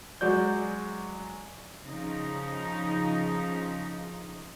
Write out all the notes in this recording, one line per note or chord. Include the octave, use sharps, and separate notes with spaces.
F#3 G#3 F#4 D5 G6
C#3 F3 D#4